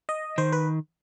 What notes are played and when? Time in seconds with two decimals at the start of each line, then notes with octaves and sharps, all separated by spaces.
0.09 D#5
0.38 D#3 C5
0.53 B4